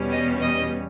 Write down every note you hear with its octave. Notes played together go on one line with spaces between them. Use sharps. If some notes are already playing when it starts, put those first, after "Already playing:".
Already playing: E2 B2 G3 C#4
D#5
D#5